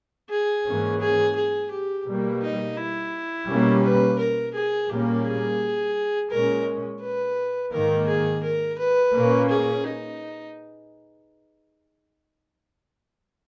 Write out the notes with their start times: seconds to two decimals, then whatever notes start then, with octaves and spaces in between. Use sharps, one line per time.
0.30 G#4
0.65 G#2 E3 A#3 C#4
1.00 G#4
1.35 G#4
1.71 G4
2.06 B2 G3 A#3
2.42 D#4
2.77 E4
3.48 B2 G3 A#3 C#4
3.83 B4
4.19 A#4
4.54 G#4
4.89 A#2 G3 A#3 C#4 G4
5.24 G#4
6.30 A#2 G#3 C#4 A#4
7.01 B4
7.72 G#2 D#3 A#3 A#4
8.07 G#4
8.43 A#4
8.78 B4
9.14 A#2 A#3 C#4
9.49 G#4
9.84 D#4